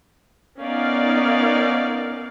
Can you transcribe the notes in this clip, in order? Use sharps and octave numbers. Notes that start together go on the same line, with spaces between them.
B3 C#4 D#4 A#4 D5 F5